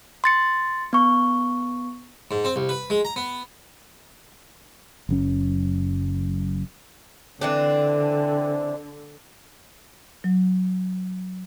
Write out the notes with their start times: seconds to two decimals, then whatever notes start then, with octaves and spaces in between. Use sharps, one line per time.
0.24 C6 A6 C#7
0.93 B3 C#6
2.31 G#2
2.44 C4
2.56 C2
2.69 B4
2.90 G#3
3.05 A#5
3.16 B3
5.09 F#1 F#2 C#4
7.41 D3 E3 C4 D4
10.24 F#3